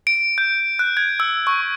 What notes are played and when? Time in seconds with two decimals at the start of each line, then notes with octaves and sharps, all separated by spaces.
0.07 D7
0.38 G6
0.79 F#6
0.97 G#6
1.20 E6
1.47 C#6